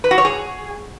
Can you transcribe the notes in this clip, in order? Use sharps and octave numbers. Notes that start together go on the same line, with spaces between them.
B4
F#4
C#5
G#4